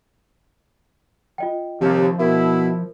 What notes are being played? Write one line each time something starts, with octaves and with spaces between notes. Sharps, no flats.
F4 D#5 G5
D#2 C3 F3
B2 E4 A#4